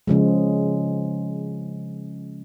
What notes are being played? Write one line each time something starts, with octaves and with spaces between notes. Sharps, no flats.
C#3 F3 G#3